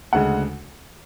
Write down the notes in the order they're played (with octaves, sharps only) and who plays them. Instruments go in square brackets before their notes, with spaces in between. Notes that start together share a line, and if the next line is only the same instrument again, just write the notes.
[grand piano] D2 C#3 G#3 F#5